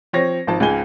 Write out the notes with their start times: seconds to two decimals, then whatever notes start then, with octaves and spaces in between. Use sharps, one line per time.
0.13 F3 C4 C#5 A#6
0.47 G#1 F3 A5
0.60 C#2 G#2 F4 G#5 G7